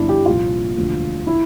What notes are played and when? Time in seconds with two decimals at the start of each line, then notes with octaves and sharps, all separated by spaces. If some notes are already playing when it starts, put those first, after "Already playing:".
Already playing: G1 G2 F3 D4 E4
0.09 G4
0.26 C2 A#2 F3 F4
0.77 E1 D2 D3 F3
1.27 E4